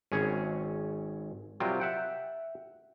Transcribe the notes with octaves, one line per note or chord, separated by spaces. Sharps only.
G#1 C#4 G#4 C#5
C3 F#3 G3 F4 G4 A#4
E5 F#5 G5